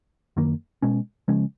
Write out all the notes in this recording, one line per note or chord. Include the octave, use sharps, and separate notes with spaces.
F#2 D#3 A#3
B2 G#3 C#4
C#3 F3 G#3 C#4